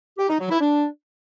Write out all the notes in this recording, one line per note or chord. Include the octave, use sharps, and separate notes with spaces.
G4
D#4
F#3
E4
D4